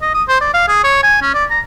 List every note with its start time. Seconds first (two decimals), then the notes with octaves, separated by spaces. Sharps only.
0.02 D#5
0.14 D#6
0.28 C5
0.41 D5
0.54 F5
0.68 G#4
0.84 C#5
1.03 G#5
1.22 C#4
1.34 D5
1.51 A#5